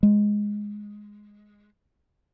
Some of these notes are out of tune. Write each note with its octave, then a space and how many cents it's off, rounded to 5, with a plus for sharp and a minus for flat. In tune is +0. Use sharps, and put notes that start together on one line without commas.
G#3 +0